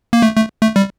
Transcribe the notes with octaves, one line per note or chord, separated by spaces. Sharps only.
A#3
A3
A3
A3
G3